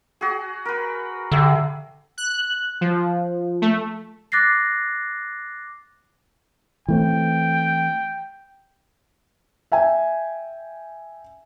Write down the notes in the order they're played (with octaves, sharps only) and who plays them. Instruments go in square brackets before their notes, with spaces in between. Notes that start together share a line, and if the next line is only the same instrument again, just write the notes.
[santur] F#4 G#4
A#4 B4
[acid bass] D3 [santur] G4 G#4 E5
[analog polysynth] F#6
F3
A3
[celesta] D6 F#6 A6 A#6 C7
[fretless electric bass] E3 A3 C4 [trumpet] G5
[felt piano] E5 G5 G#5